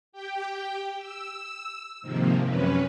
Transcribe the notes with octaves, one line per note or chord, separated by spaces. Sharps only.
G4 G5
E6
G#2 C3 D#3 F3 A#3
F#2 C3 C#4 B4